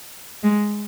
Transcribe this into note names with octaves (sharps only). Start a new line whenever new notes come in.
G#3